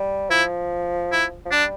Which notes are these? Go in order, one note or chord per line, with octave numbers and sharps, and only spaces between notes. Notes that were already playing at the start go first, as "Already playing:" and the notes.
Already playing: G3
F3 E4
E4
F3
G3 D4